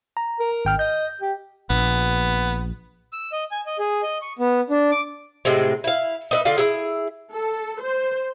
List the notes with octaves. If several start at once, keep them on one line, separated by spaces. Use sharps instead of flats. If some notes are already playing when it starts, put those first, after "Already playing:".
A#5
A#4
G#1 G5 F6
D#5 G6
G4
A#1 B3
E6
D#5
G#5
D#5
G#4
D#5
C#6
B3
D4
D6
A2 C3 G#3
E4 F5
D#4 B4 E5
D3 F4 D5 F5
E4 G#4
A4
C5